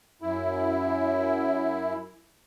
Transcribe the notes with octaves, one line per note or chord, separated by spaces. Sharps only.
F#2 E4